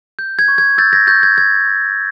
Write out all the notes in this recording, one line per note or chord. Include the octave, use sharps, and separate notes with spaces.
G6
G#6
C#6
G#6
E6 G6 A6
G#6 A#6
C#6 G6 A6
G#6
G6 G#6
C#6